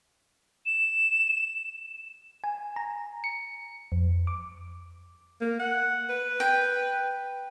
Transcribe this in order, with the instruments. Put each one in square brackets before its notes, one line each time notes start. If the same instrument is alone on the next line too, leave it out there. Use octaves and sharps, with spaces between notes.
[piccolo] E7
[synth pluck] G#5
A#5
C#7
F2
D6
[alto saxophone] A#3
F#5
B4
[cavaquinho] G5